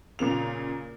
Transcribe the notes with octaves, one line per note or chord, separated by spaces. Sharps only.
A#2 C#3 A#3 F7